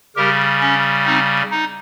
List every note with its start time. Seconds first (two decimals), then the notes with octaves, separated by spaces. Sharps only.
0.16 C#3 G3 G4 A#4
0.61 C#4
1.06 C4 D#4
1.51 D#4